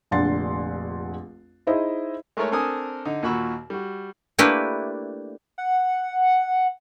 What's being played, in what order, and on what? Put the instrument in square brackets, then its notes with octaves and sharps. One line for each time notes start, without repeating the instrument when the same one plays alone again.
[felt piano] F1 A#1 D3 F#5 C6 A6
D#4 E4 G#4 C5 D#5 E5
[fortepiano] G#3 A3 D#4 A#4 C#5
C4 D4 A4 A#4 G#5 D#6
D3 D#4
D#2 A#2 F#4 B5 C#6 E6
G3 F#4
[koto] A3 A#3 D4 E4 G4 B4
[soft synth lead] F#5